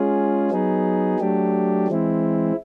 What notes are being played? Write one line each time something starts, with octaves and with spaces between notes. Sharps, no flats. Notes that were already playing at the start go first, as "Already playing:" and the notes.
Already playing: G#3 C#4 F4 G#4
F#3 B3 D#4 G#4
F#3 A3 D4 G4
E3 G#3 C4 E4